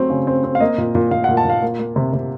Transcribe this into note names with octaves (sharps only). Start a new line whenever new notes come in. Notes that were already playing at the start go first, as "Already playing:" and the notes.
Already playing: F#3 A3 C4
C#3
C4
C4
F5
A#3 D#5
A#2
A#2
A#2 F5
F#5
A#2
A5
A#2 F5
A#3
A#3
C3
C3